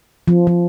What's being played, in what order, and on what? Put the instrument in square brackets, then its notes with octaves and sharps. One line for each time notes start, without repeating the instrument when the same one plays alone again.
[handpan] F3
F3